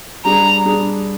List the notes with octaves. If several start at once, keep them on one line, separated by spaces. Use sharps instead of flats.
G3 D4 G#4 A#5
G3 D4 G#4